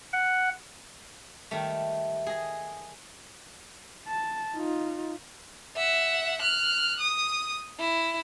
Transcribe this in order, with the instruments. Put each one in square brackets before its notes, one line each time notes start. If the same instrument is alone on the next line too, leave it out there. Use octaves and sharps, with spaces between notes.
[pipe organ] F#5
[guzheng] D#3 G3 A3
G#4 D#5
[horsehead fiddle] A5
D#4 F4
[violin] E5 F#5
F6 F#6
D#6
E4